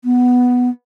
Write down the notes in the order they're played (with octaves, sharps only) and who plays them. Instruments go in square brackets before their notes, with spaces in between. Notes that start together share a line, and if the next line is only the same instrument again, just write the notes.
[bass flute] B3